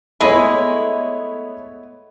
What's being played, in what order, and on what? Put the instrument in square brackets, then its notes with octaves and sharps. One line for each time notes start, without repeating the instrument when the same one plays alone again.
[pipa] G#3 E4 [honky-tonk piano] A3 B3 C#5